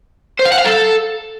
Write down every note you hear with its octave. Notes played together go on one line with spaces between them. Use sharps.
C5
F5
F#5
F5
A4